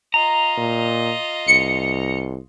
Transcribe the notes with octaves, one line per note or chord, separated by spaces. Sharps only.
F4 D#5 A#5
A#2
C2 C#7